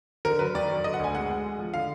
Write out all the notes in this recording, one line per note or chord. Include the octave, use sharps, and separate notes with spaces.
D3 A#4
F#3 B4
D#2 D5
F#3
D3 D#5
F#5
D2 G#5
G#3 F#5
G#3
G#3
F3
D3 F5